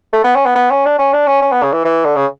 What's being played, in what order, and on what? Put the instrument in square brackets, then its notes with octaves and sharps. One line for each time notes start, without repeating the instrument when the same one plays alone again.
[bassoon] A3
B3
C#4
B3
B3
C#4
D4
C#4
D4
C#4
C#4
B3
C#3
E3
E3
D3
C#3